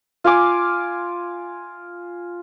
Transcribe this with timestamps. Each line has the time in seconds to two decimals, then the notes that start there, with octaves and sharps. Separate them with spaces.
0.24 F4 F5 G#5 D6